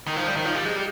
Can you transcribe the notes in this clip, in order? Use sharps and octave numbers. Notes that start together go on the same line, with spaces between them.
D#3
F3
G3
D#3
F3
G3
G#3
G3